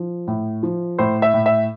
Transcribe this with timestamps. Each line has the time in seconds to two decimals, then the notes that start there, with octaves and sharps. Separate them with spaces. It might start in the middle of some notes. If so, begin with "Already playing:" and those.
Already playing: F3
0.27 A2
0.63 F3
0.98 A2 C5
1.22 E5
1.34 A2
1.46 E5